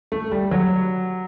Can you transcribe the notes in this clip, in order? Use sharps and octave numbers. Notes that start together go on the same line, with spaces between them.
A3
G3
F#3